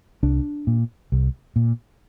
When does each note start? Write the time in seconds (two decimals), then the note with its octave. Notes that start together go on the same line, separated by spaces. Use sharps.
0.23 C2 D4
0.67 A#2
1.12 C2
1.56 A#2